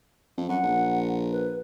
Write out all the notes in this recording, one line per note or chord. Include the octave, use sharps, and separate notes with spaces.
F2
F#2 F#5
A#1
B4